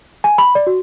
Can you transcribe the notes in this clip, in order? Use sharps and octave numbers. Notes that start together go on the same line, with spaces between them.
G#5
B5
D5
F#4